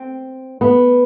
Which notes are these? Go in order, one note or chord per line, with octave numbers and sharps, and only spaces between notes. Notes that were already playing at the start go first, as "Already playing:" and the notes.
Already playing: C4
B3